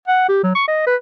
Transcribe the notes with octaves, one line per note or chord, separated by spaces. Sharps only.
F#5
G4
F#3
C#6
D#5
B4